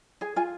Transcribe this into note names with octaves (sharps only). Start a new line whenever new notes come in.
G#4 G#5
F4 G#5